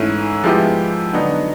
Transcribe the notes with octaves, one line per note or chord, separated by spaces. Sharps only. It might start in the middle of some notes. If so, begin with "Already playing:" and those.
Already playing: G#2 E3 A3 C#4 E4
F3 G#3 B3 E4 G4
D3 F#3 B3 D#4